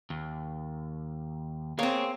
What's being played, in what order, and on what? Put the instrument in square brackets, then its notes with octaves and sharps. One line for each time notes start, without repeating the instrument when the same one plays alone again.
[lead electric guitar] D#2
[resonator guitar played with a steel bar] A#3 C4 [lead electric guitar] G#4 C#5